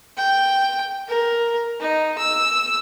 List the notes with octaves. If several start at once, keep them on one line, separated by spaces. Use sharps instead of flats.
G5
A#4
D#4
E6